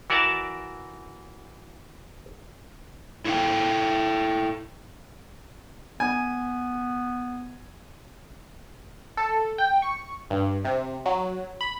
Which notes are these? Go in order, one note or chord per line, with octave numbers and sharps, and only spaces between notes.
E3 F#4 A#4 D5 E5 A5
E4 A4 F5 G5
B3 G#5
A4
G5
C#6
G2
C3
F#3
B5